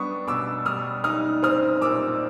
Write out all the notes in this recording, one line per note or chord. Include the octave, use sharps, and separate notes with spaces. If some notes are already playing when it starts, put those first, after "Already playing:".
Already playing: G3 B3 D4 C#6 D#6
B2 D6 E6
G3 D#6 F6
D#4 D#6 F6
C4 D#6 F6
A#2 D6 E6